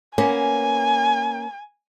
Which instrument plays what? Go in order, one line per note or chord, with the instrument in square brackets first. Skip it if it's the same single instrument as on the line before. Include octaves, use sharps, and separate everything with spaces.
[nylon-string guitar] A#3 B3 C#4 [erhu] G#5